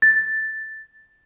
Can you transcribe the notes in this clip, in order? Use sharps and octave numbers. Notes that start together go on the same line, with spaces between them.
A6